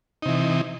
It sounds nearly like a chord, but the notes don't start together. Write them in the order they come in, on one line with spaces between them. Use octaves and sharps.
D#4 C3 E3